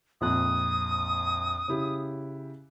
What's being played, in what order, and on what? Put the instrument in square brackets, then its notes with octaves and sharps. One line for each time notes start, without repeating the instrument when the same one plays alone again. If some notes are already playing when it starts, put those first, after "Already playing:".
[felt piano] A#1 F2 F#6 [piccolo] D#6
[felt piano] C#3 E4 G4